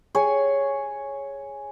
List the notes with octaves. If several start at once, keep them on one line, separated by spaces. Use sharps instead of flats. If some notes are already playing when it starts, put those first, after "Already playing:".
G#4 C#5 G#5